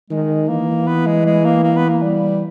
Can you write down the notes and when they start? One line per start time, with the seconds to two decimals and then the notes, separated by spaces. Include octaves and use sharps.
0.10 D#3 G#3
0.48 E3 A#3
0.87 B3
1.06 G#3
1.25 G#3
1.45 A#3
1.63 A#3
1.77 B3
1.89 A#3
2.02 G3